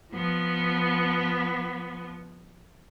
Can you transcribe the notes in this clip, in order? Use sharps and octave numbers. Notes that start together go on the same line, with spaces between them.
F3 B3